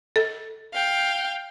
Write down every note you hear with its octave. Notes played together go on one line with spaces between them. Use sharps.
A4
F5 G5